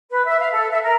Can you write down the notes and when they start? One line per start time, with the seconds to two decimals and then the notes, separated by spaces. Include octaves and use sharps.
0.10 B4
0.26 E5
0.39 F5
0.52 A4
0.70 E5
0.82 A#4